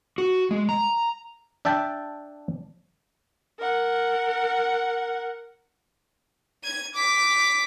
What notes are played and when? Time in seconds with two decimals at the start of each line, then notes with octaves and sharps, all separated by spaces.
0.18 F#4
0.51 G#3
0.69 A#5
1.65 D4 E5 G5 A5
3.59 A#4 F#5
6.64 G#6 D#7
6.94 D6 B6